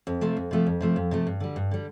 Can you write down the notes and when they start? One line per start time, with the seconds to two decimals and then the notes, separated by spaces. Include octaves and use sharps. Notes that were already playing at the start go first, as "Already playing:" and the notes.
0.07 F2
0.21 C3 F3 A3
0.37 F2
0.51 C3 F3 A3
0.67 F2
0.81 C3 F3 A3
0.96 F2
1.11 C3 F3 A3
1.27 G2
1.40 D3 G3
1.56 G2
1.71 D3 G3